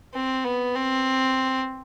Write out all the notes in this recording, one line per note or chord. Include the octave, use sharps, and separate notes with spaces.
C4
B3
C4